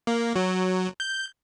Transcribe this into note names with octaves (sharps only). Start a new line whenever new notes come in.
A#3
F#3
G6